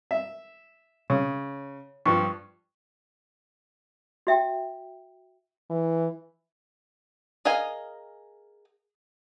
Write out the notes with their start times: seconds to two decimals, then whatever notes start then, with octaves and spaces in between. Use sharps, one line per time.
0.11 E5
1.10 C#3 C#5
2.06 G2 F3 C#6
4.27 F#4 E5 G5
5.70 E3
7.45 G#4 A#4 D#5 F5 G#5